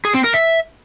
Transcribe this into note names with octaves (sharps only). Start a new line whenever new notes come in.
G#4
C4
A#4
E5